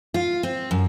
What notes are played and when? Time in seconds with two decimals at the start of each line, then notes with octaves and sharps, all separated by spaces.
0.14 F4
0.43 C4
0.71 F#2